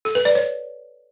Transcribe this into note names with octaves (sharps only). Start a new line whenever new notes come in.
A4
B4
D5
C#5